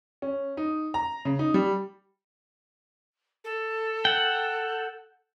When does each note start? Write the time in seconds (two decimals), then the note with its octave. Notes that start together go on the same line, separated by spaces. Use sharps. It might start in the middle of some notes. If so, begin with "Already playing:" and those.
0.22 C#4
0.57 D#4
0.94 A#5
1.25 C#3
1.39 D#4
1.54 G3
3.44 A4
4.05 F#5 G5